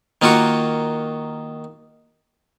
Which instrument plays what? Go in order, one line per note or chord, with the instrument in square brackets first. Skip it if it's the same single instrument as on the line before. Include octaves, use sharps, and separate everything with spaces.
[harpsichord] D#3 A#3 F4 F#4 C#6